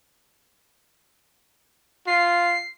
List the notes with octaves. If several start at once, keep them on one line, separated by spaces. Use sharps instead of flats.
F4 C7